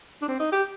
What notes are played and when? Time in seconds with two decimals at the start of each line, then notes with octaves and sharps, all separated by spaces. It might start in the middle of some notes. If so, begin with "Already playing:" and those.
0.22 D4
0.28 C4
0.39 D#4
0.52 G4